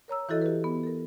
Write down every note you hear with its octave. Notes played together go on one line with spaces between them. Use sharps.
A#4 C#5 A#5 E6
E3 E4 F#4 A4 D#5
G4 B4
B3
A4 A#4